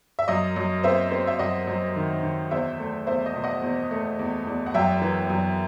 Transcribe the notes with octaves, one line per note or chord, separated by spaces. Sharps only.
E5
F#2 D#5
F#2
C4 C5 E5
C4
E5
F#2 D#5 F#5
F#2
D#3
D#3
E2 C5 E5
A3
E2 C5 E5
D#5
B2
D#5 F#5
E2
A3
E2
E2
F#5
F#2 E5 G5
E3
F#2